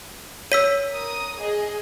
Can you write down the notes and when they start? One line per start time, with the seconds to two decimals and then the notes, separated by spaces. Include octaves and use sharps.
0.52 C#5 E6 B6 D#7
0.91 A#4 D#6
1.38 G#4 D#5